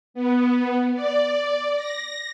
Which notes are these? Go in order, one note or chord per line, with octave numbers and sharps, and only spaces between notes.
B3
D5
A#6